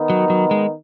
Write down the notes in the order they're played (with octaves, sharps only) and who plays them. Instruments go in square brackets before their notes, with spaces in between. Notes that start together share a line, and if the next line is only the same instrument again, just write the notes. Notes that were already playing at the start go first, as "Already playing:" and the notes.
Already playing: [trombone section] D#3 B3 D#4
[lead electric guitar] F#3
F#3
G#3